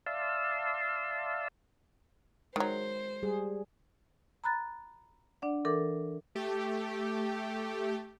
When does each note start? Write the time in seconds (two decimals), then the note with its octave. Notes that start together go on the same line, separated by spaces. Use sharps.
0.06 D5 E5 F5 A5 C6 E6
2.56 D#3 F#3 G#3 C5
3.23 G3 G#4
4.44 A#5 B5 F#6 A6
5.42 D4 D5 F#5
5.65 E3 A4 A#4 D6
6.35 A3 G4